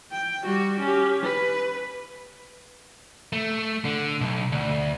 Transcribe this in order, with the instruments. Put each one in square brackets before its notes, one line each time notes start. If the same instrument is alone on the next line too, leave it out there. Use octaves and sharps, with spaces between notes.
[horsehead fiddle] G5
G3 F#4
C#4 G4
B4
[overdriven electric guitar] A3
D3
B1
D2